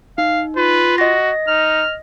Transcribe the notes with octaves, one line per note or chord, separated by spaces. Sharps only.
D#4 F5
F4 B4
F#4 D#5 A#6
D#4 F6